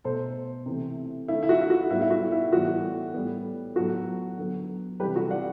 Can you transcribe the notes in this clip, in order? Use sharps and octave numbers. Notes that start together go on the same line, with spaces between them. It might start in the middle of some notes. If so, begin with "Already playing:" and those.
B2 A3 A4 C5
C3 E3 A3
D3 A3 E4
E4
F#4
E4
F#4
A2 G3 B3 E4
E4
F#4
E4
A2 E3 G3 B3 F#4
A2 G3 B3
A2 F#3 B3 F#4 A4
D3 F#3 B3
C3 E3 G3 G4 B4
F#4 A4
D5 F#5